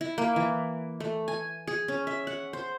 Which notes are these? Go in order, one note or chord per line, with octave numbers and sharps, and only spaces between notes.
E4
A#3
E3
A3
G#5
G#4
C#4
E5
F#5
C5